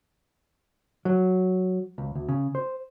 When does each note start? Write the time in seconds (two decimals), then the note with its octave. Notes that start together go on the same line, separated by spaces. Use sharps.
1.05 F#3
1.98 C#2
2.15 D2
2.29 C#3
2.55 C5